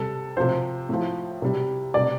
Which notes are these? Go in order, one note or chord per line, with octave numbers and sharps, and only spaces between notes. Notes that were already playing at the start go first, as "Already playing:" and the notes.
Already playing: C3 G3 A4
C3 F3 C5
A2 F3
C3 G3
C3 G3 D5